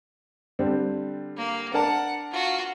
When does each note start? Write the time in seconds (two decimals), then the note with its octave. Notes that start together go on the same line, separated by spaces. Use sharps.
0.59 D3 G3 C4
1.37 A#3
1.74 D4 A#4 F#5 A5
2.32 F4 F#4